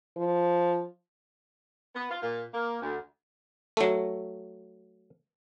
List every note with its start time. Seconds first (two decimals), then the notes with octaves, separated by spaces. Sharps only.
0.17 F3
1.95 B3
2.10 F4
2.22 A#2
2.54 A#3
2.82 D2
3.77 F#3 A3